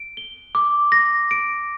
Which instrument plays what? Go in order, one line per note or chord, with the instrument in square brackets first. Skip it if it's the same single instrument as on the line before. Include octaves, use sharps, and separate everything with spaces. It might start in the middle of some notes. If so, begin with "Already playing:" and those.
Already playing: [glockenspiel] D7
G7
D6
A#6
D7